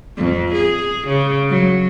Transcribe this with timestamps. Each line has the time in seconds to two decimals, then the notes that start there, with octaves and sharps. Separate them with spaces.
0.17 F2
0.54 G#4
1.08 C#3
1.49 F#3